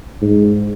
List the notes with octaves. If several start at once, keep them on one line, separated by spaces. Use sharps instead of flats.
G#2